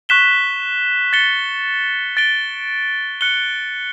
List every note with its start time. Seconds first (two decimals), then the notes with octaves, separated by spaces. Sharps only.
0.09 C#6 F#6 B6 E7 G7
1.13 A6 C#7 G7
2.17 A6 D7 G7
3.21 F#6 C#7 G7